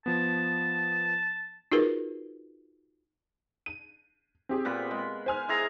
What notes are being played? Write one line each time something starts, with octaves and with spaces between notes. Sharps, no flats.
F3 B3 A5
D#4 F4 F#4 G#4 A#4 B4
D#7
C4 G4 G#4
A#2 B3 B5
G#3
C5 G#5 F6
E4 G#4 A#5